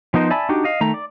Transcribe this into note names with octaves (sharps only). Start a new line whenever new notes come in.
F3 B3 D#4 A#4 C5
D5 E5 G#5 A5 B5
D4 D#4 F#4 G4
D#5 F5
D#3 A3 A#5
D5